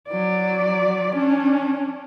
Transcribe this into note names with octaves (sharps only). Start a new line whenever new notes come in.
F#3 D5
C#4 D4